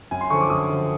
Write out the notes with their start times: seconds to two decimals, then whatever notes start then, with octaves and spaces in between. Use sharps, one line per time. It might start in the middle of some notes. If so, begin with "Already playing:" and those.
0.11 F#2 G#5
0.21 C6
0.30 D3 F3 C#6
0.40 D6
0.50 F#2 D#6
0.69 D3 F3